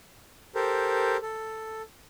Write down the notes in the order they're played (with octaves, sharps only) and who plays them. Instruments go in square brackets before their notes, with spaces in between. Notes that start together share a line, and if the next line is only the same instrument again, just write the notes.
[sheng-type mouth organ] G4 A4 A#4 C5
A4